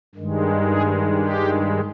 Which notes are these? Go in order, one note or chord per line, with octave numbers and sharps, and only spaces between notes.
G2 D#3 G#3
G#4
G4